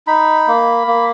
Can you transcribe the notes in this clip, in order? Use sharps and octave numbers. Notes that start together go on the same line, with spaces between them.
D#4 B5
A#3
A#3